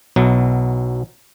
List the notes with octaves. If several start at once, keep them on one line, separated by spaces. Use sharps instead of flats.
B1 B2 F#3 E4